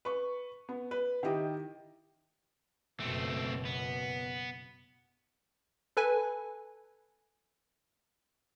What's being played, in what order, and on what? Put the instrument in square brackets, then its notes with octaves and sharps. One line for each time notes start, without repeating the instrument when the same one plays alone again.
[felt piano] B4 C#6
B3
B4
D#3 E4 G4 D#5
[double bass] F#1 B2 [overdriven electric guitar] A3 C4
[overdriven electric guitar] B3
[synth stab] A4 B4 G#5